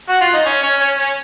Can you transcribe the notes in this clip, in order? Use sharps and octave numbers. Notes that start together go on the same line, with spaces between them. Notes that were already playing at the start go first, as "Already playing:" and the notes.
F#4
F4
D#4
C#4
C#4
C#4
C#4